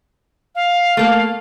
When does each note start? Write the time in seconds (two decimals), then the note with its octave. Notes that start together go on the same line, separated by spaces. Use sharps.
0.55 F5
0.97 A3 A#3